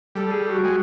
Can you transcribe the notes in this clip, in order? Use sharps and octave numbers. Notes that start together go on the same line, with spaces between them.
G3 A4
G#4
G4
F#4
G#3